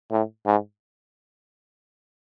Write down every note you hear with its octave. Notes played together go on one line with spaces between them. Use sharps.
A2
G#2